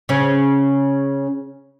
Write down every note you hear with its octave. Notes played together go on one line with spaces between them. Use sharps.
C#3 C#4